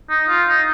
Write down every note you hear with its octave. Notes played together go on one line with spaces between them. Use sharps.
D#4
F4
D#4